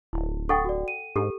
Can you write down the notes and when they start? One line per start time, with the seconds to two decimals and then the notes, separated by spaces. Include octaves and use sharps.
0.13 D1 E4
0.49 A4 F#5 G5 C#6 D#6 A6
0.65 F#4 D5
0.88 D#7
1.16 G#2 G4 A4